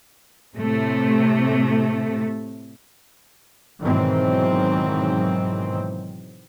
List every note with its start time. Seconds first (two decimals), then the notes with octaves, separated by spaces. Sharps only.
0.56 A2 C3 A3
3.81 G#2 B2 D#3 E3 F#3 C4